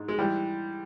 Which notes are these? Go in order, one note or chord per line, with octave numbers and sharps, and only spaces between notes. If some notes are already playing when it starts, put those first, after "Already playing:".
Already playing: G#2
G#3
E3 G3